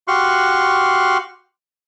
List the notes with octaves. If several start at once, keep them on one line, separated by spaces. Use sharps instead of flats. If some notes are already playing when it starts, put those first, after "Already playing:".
F#4 G4 F5 C6 C#6 F#6